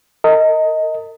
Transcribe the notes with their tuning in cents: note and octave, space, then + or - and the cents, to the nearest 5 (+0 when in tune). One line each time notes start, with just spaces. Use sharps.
A#4 -35 D#5 +15